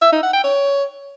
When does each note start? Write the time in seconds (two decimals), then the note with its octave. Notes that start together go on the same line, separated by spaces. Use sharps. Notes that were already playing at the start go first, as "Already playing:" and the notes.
0.02 E5
0.12 D#4
0.23 F#5
0.33 G5
0.44 C#5